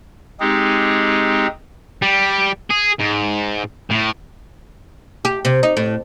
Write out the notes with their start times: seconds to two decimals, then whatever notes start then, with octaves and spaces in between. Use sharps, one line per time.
0.40 G#3 C4 D#4 G4 G#4
2.02 G3
2.70 G#4
2.99 G#2
3.90 A2
5.25 G4
5.45 C3
5.63 D#4
5.77 A2